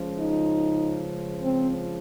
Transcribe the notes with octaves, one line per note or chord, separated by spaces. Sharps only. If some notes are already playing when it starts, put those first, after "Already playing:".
Already playing: C#2 C#3 F3
D#4
C4